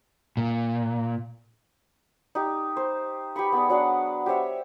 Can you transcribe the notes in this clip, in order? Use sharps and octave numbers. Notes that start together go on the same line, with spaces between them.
A#2
D#4 G4
C5
G4 B4 B5 C#6
B3 G#4 D5
F#3 D4 F#5 C#6
G4 C5 C#5 E5